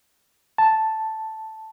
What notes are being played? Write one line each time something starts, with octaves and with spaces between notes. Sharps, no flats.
A5